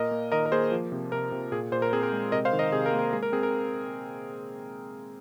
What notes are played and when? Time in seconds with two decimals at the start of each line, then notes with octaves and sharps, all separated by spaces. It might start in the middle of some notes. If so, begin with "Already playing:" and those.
Already playing: A#2 A#3 A#4 D#5
0.11 A#3
0.32 D#3 A#4 D#5
0.46 A#4
0.52 A#3 G#4 C5
0.72 F3
0.92 C3
1.12 C3 A#4
1.32 C3
1.52 A#2 G#4
1.72 A#2 C5
1.82 A#4
1.93 C4 G#4
2.03 A#4
2.12 G#3
2.32 C3 A#4 D#5
2.45 C5 F5
2.53 D#3
2.59 A#4 D#5
2.72 C3 G#4
2.86 A#4
2.93 A#3
2.99 A#4
3.13 G#3 G#4
3.23 A#4
3.32 C4 G#4
3.43 A#4